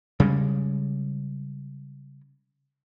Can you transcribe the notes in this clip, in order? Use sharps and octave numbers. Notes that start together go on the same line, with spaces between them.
C#3 G3 G#3